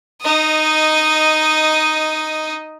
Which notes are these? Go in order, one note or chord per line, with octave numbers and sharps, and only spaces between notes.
D#4 D#5